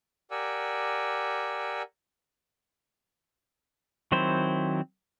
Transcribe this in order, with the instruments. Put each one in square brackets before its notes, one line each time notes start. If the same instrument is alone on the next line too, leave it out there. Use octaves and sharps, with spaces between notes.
[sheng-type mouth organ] G4 A#4 D5 F#5 G#5 E6
[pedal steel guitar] D#3 F#3 C4 E4 C5